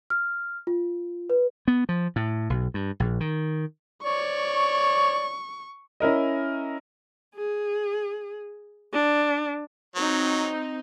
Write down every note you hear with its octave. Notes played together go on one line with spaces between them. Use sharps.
F6
F4
B4
B3
F3
A2
B1
G2
A#1
D#3
C#5 D5 C#6
C#4 E4 A#4 D#5
G#4
D4
F#3 C4 D#4